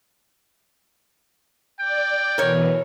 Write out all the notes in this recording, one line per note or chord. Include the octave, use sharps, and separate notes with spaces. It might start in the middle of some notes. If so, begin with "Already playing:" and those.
D5 G5
B2 E3 A#4 C#5